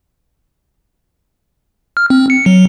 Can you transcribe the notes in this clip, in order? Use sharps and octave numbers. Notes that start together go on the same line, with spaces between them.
F6
C4
C#7
F#3